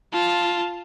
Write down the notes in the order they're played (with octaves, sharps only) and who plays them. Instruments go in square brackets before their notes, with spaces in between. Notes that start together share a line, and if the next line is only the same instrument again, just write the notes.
[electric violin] F4 A5